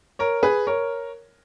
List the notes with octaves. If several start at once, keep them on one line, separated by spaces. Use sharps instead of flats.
A#4 C#5
G#4 B4
A#4 C#5